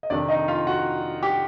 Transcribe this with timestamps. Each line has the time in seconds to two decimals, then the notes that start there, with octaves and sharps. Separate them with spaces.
0.03 D#5
0.10 F2 C3 D#3 D4 D5
0.28 D#4 D#5
0.48 F4 F5
0.67 F#4 F#5
1.23 G4 G5